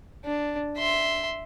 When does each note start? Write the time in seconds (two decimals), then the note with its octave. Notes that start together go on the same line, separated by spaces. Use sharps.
0.25 D4
0.77 E5 C6